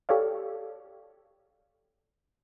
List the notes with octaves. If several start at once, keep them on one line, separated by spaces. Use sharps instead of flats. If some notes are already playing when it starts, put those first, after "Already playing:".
G4 A4 C#5 D5 F5